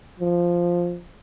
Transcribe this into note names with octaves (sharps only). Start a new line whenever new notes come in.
F3